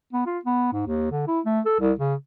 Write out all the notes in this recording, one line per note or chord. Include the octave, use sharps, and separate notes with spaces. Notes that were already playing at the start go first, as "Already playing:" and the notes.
B3
F4
B3
G#2
D#2
D3
E4
A3
A4
C2
C#3